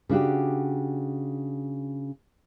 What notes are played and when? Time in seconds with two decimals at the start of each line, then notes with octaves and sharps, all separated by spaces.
0.09 C#3 D4 F#4 G4